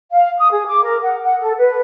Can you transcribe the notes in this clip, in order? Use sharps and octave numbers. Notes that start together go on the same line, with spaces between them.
F5
D#6
G#4
D6
A#4
F#5
F#5
A4
B4